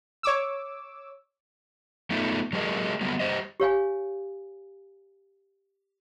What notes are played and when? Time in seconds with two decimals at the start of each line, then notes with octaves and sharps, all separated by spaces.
0.23 C#5 D6 E6
2.10 A3 B3 D#4 F4
2.53 F#3 G#3 G4 G#4 A#4 D#5
3.01 F#3 G3 B3
3.20 G3 G4 C5 D#5
3.60 G4 C#5 F5 G#5